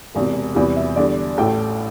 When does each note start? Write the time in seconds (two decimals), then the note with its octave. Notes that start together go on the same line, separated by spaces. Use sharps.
0.15 E1 E2 C3
0.55 E2 C3 E3 G3
0.76 E5
0.96 E2 D3 G3 D5
1.38 A1 A2 A3 G5